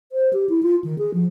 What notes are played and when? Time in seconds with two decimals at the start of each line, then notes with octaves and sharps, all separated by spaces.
0.12 C5
0.33 G4
0.49 E4
0.63 F4
0.84 D#3
0.98 G#4
1.14 F3